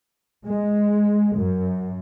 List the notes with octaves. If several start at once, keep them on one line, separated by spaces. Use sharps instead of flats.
G#3
F#2